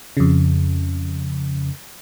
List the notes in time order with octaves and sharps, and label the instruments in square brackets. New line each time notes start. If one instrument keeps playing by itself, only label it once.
[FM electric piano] F2 C#3